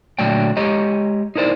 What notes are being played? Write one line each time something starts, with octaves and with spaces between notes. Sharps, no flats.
A#2 D3 F#3 A3 D5 G5
G#3 G4 C#5 D#5 A#5
D#4 E4 A#4 C5 D5